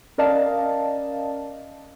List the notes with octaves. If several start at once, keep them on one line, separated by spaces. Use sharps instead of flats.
C#4 A#4 D5 D#5 F5 A5